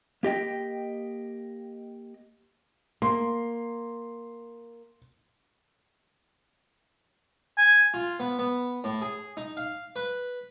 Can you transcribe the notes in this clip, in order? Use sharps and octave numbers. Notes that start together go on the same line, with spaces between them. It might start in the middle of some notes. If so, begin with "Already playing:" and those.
A#3 G4 D#5 G5
A#3 C6
G#5
F4
B3
B3
A2
G#4
D#4
F5
B4